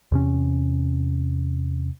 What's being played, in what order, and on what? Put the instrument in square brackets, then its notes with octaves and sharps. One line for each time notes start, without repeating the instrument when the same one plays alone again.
[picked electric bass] E2 C3 C#4